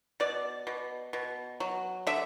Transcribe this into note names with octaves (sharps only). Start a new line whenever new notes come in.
B2 D5
B2
B2
F#3
D3 E5